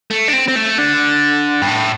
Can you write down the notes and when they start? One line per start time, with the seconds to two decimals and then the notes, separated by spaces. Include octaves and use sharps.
0.11 A3
0.28 D4
0.33 C4
0.48 C4
0.56 A3
0.78 D3
1.62 G2
1.68 A2